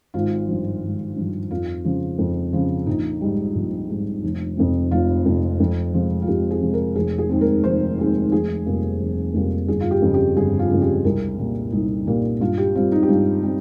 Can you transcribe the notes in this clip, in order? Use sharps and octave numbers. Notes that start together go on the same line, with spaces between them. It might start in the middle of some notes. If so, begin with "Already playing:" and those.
G#1 F4
G2 F3
G#1
G2 F3
F2 F4
C#3 F3
F2
C#3 F3
A#1 D#4
G#2 G3
A#1
G#2 G3
F1
F2 C3
F1 F4
F2 C3
F2
C3 F3 G#3
F4
F2 G4
G#4
C3 F3 G#3
A#4
F1 G#4
G#4
D#2 D#3 G#3 C4
A#4
F1 C5
D#2 D#3 G#3 C4
F1 G#4
F2 C3 G3 A#3
F1
F2 C3 G3 A#3
G1 G#4
F4
G4
F2 C#3
G4
G1 G#4
F4
F2 C#3
G4
C2 A#4
A#2 G3 A#3
C2 D#4
A#2 G3 A#3
G2 F4
G4
G3 C4 F4
D#4
G4
G2 F4
G3 C4